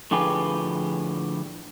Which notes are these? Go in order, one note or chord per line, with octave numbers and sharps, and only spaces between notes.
A2 D3 F3 G4 G#4 B4